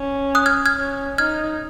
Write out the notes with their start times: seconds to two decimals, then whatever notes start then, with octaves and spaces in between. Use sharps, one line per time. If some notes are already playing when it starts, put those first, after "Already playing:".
Already playing: C#4
0.35 D#6 F#6
0.46 F6 G#6
0.66 F6 G#6
0.77 C#4
1.18 D#4 F6 G#6